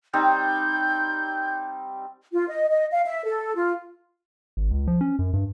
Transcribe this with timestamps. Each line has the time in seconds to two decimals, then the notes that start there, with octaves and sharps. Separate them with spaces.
0.13 G3 C4 D#4 G6
2.33 F4
2.48 D#5
2.69 D#5
2.92 F5
3.05 E5
3.24 A4
3.55 F4
4.57 G#1
4.71 C#2
4.87 F3
5.01 C#4
5.19 F#2
5.33 G2